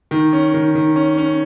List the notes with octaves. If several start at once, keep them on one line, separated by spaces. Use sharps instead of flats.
D#3
C#4
D#3
D#3
C#4
C#4